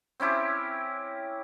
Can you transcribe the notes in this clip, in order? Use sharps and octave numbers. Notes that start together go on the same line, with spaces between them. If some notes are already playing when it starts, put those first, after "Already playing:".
C4 C#4 E4 G4